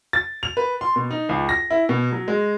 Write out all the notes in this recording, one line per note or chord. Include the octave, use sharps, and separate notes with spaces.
A6
F7
B4
C6
B2
D#4
C#2
A#6
E4
B2
F#3
G#3